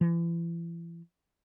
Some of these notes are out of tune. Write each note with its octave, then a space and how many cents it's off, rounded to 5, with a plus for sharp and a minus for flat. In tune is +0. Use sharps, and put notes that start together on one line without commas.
E3 +40